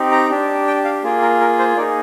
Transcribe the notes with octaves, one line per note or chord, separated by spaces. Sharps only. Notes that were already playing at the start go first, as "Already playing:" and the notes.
Already playing: C4 D#4 G4
A#5
D4 G4
G5
F5
A#3 F4 G#4
A#4
A#4
C5
A#3 D#4 G#4 D5